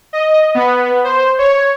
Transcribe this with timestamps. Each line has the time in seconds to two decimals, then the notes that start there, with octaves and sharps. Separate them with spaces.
0.13 D#5
0.55 B3
1.04 C5
1.39 C#5